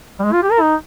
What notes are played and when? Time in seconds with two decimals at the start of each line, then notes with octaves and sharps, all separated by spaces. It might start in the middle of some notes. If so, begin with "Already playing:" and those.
0.19 G3
0.24 G#3
0.33 F4
0.43 G4
0.51 A#4
0.61 D#4